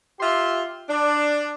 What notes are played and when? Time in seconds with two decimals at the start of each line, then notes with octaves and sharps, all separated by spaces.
0.20 F4 G4 E5 C6
0.89 D4